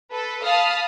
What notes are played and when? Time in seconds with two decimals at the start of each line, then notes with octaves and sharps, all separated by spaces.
0.11 A4 B4
0.43 F5 A5 B5 D#6 F6